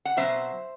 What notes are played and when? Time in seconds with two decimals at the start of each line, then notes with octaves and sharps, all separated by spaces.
0.05 F#5
0.17 B2 F#3 C4 C5 E5